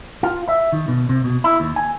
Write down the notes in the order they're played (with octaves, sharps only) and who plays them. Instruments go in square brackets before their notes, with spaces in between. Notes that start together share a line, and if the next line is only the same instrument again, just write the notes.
[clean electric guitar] F4
E5
D#3
B2
C3
B2
E4
D#2
G#5